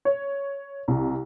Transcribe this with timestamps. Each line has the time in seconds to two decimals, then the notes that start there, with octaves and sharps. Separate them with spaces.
0.05 C#5
0.88 C2